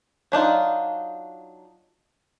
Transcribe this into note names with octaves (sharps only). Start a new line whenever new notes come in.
F#3 D4 D#4 F4